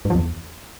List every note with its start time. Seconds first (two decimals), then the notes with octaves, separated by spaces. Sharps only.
0.05 G2
0.10 F3
0.15 E2